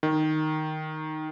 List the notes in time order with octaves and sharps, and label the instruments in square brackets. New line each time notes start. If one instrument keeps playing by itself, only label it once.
[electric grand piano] D#3